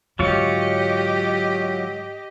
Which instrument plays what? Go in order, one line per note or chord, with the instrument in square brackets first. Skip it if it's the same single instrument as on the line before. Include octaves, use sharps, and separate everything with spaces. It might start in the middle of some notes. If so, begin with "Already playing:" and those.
[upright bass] G#2 D3 [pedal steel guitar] F#3 F4 C#5 [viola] G4 D#5